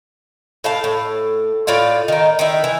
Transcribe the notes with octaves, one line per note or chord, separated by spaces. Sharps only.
A2 F5 A5
A2
A2 F4 D5 F5
D#3 D#4
D#3 E4
E3